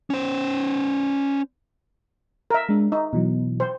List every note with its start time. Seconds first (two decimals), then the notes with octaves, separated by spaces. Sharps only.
0.10 C#4 C5
2.50 A#4 E5
2.69 G#3 D4
2.92 D#4 E5
3.13 B2 E3 F#3
3.60 C5